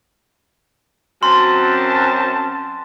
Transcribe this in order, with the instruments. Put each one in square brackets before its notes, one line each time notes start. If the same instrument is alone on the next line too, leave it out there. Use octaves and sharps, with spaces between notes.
[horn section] F#2 C4 A5 [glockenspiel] C6